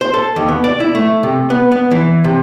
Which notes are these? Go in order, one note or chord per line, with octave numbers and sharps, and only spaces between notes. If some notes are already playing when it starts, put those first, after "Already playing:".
C5
A4
D#2
B3
D5
E4
A3
C3
B3
B3
E3
C3